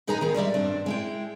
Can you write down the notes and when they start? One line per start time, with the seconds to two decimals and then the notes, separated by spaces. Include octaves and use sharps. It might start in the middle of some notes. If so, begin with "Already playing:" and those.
0.07 D#3 D#4 G#4 B4 G#5 A#5
0.21 D#3 B3 G#4
0.34 G3 G#3 D5 E5
0.54 G2 C4 D4
0.86 G#3 E4 G5